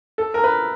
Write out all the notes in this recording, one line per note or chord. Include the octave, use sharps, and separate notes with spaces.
A4
A#4
B4